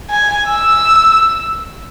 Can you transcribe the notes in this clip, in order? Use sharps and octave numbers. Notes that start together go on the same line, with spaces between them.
G#5
E6